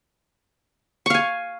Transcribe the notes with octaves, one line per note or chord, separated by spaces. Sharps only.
F5 G#5 C#6